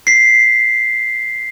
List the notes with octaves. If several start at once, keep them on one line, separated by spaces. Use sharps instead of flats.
B6 C7